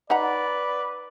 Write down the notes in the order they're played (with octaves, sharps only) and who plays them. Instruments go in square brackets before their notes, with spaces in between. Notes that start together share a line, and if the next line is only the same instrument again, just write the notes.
[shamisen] D#4 F#5 A#5 [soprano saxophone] B4 [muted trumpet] D5